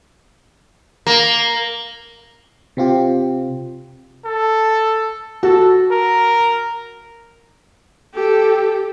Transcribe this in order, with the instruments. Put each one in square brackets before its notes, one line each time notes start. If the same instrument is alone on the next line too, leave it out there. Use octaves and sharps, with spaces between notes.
[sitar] A#3
[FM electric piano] C3 C4 F4 G4
[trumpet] A4
[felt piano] F#4 [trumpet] A4
[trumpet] A#4
[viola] G4 A4